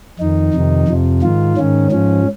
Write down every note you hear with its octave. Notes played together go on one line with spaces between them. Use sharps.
F2 D#3 D#4
F2 C3 D#3
F2 C3 F3
G#2 D#3 F4
G#2 D#3 C#4
G#2 F3 C#4